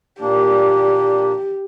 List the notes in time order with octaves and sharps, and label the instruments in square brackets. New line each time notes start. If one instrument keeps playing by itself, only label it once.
[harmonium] A#2 A#3 D4 [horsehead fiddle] G4